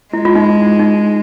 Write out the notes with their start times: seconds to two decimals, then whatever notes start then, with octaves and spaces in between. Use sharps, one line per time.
0.13 G#3 E4
0.25 F4
0.35 D#4
0.79 D#4